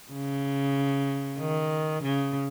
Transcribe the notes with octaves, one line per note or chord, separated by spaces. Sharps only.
C#3
D#3
C#3